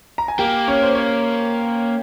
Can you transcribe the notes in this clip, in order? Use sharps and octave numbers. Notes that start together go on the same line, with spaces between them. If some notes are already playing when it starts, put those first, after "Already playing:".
A#5
G#5
A#3 G4 G5
C#4 C#5
C5
C#5